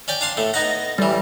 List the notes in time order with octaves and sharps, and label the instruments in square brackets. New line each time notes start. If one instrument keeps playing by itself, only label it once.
[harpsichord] C#4 D5 G5
D4 F5 C6
A2 A3
[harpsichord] B3 D#4 F#5 [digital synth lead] A#6
[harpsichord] A1 E3 [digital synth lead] G3